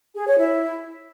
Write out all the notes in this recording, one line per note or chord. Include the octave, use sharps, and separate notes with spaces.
G#4
C#5
E4